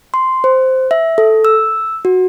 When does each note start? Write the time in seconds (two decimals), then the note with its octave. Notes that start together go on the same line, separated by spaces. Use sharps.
0.14 C6
0.44 C5
0.91 E5
1.18 A4
1.45 E6
2.05 F#4